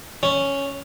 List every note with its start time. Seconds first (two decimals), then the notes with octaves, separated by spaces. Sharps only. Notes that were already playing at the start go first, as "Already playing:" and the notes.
0.23 C#4